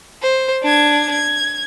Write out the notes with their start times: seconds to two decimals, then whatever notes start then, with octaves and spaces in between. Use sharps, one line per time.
0.22 C5
0.63 D4 G#6
1.12 G#6